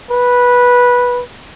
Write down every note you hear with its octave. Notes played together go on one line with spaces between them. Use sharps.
B4